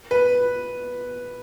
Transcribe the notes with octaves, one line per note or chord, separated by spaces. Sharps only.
B4